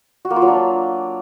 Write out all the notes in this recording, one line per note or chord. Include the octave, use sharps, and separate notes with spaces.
F#4
A#3
F4
F#3
D4